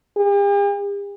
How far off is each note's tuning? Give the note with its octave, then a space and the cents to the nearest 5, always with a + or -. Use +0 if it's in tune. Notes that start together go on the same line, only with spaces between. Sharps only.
G4 +45